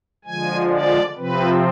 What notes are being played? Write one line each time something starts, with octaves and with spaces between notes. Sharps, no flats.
D3 F3 G#3 G#5
D5
C3 F3 C4 B4